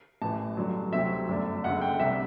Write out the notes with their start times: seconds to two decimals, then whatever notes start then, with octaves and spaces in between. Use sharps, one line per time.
0.22 A1 A2 E3 A5
0.57 G2 D3 F#3
0.93 D2 C3 F#3 C4 E5
1.28 G1 F#2 D3 A3 D4
1.63 F#1 F#2 D3 F#5
1.81 G5
2.00 C2 C3 G3 E5